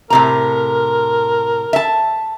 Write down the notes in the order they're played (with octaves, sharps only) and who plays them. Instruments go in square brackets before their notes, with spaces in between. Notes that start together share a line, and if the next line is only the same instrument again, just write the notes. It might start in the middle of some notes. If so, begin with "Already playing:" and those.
[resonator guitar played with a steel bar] A2 C3 A#5 [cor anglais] A#4
[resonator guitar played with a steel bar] E5 A5